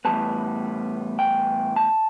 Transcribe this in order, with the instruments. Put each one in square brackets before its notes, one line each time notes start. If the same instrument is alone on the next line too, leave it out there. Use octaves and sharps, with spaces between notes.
[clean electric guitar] A2 E3 G3 B3 A5
G5
A5